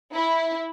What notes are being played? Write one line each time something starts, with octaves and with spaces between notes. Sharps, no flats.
E4